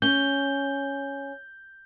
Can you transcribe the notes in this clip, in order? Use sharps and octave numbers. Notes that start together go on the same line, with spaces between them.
C#4 G6 G7